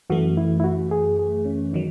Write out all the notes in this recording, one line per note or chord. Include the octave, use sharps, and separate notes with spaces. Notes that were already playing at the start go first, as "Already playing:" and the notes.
F#2 E3 A3 F#4
E4
E4
F#4
G#4
G#4
C#4
D#3 F#3 D#4